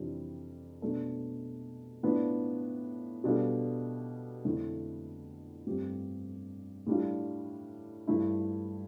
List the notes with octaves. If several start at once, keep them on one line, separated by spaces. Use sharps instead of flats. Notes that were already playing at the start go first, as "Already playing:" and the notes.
Already playing: F2 C3 E3 G3 D4
B2 A3 D4 A4
A2 F3 B3 D4
B2 G3 D4 F4 A4
F2 D3 F3 A3 E4
G2 F3 A3 C4 G4
A2 G3 D4 F4
G2 F3 A3 E4